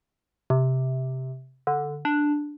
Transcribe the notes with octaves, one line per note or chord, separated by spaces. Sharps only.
C3
D3
D4